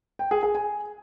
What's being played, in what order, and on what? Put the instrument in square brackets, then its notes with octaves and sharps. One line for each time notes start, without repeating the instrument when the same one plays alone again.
[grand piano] G5
G#4
G#4
G#5